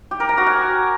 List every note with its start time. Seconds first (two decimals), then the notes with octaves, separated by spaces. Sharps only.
0.11 G4
0.20 A#4
0.29 A#5
0.38 F#4
0.47 G#5